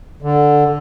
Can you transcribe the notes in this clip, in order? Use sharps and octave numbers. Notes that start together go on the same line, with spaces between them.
D3